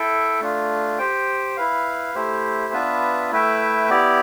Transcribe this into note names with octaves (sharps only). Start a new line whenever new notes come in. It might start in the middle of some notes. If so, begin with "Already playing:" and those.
Already playing: E4 A4 E5 G5
A3 D4 F4
G4 C5 G5
E4 B4 F5
A3 E4 G4 C5
B3 D4 F4 B4 E5
A3 E4 B4 E5 G5
B3 E4 G4 D5